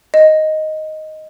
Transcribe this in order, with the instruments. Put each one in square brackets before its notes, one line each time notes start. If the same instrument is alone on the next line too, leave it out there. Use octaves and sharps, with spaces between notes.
[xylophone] D#5